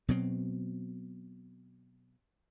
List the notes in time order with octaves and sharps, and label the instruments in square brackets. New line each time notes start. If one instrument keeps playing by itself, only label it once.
[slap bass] B2 F#3 C4